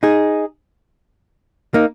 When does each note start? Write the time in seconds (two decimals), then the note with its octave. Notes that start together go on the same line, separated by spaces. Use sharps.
0.03 D#4 G#4
1.74 A#3 D#4